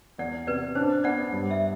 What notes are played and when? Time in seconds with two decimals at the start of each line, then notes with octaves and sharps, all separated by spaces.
0.18 E2 D5 F#5
0.47 C3 B4 D5
0.75 D4 C5
1.04 B3 D5 F#5
1.33 G2
1.51 E5